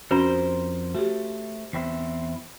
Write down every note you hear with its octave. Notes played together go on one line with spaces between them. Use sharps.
F2 C#4 F#4 A#4 C5
A3 F#4 G4
E2 C4 E4